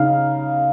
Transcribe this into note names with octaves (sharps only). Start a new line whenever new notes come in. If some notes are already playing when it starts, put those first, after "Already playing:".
Already playing: C#3 D#4 F5